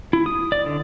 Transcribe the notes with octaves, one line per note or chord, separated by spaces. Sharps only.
E4
D#6
D5
D3